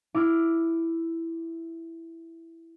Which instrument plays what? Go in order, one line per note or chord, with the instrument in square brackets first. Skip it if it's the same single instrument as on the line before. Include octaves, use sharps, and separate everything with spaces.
[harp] E4 D6 F6